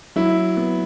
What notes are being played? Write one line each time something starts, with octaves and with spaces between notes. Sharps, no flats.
F#3 E4
B3